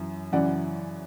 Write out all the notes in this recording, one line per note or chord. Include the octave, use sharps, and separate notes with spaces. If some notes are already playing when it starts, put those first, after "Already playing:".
Already playing: F#2 E3
F#2 C#3 E3 D5 F#5